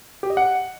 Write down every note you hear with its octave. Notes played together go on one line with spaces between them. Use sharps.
G4
D#5
F#5